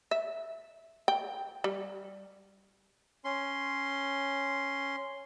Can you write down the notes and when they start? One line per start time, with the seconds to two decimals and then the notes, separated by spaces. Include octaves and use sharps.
0.11 E5
1.08 G5
1.64 G3
3.24 C#4 C6